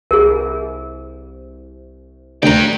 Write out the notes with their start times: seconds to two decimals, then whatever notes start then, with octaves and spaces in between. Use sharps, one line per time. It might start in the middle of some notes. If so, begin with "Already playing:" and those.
0.11 C2 G#4 A#4
2.43 D2 D4 G5 A#5